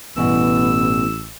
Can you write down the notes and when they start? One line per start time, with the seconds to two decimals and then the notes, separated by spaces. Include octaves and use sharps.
0.16 A1 G2 B2 E3 B3 E6